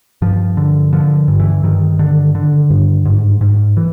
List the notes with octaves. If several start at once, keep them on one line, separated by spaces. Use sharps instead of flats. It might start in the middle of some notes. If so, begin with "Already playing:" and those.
G2 F3
D3
D3 F3
G2
E3
G2 D#3
D3
D3
G2
G#2
G#2
E3